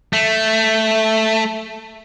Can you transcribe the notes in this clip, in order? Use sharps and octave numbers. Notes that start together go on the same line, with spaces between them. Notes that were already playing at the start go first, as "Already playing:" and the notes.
A3